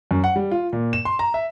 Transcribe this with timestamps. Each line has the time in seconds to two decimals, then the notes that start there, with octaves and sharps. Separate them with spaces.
0.11 F#2
0.24 F#5
0.36 G3
0.51 F4
0.73 A#2
0.93 E7
1.05 C6
1.19 A#5
1.34 E5